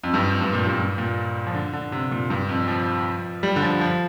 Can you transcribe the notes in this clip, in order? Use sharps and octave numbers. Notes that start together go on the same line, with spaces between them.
F2
G2
F2
G2
A#2
G2
G2
A#2
F3
D3
D3
C3
A#2
G2
F2
F3
G3
D3
F3
F3